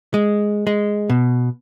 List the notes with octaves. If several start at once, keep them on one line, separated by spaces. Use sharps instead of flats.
G#3
G#3
B2